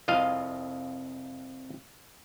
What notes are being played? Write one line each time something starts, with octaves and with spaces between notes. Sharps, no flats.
C2 F2 F4 D#5 F5